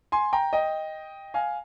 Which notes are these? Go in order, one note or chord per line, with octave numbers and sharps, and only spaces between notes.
G#5 C6
G5 A#5
D#5 G5
F5 G#5